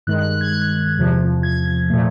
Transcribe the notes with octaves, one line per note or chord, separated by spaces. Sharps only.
G2 D#3 G#3 F#6
F#6
F#6
G#6
F#6
E2 C3 F3
G#6
A#2 F3 A3